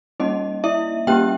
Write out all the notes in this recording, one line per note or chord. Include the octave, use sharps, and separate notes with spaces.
G3 A#3 C#4 D#4 D#5
E4 E5
G3 A#3 C#4 G4 G5